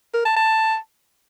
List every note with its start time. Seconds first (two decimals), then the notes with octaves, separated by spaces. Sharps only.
0.14 A#4
0.25 A5
0.36 A5